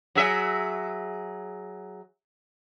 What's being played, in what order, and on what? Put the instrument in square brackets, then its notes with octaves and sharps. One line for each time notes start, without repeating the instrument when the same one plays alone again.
[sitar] F#3 G#4 E5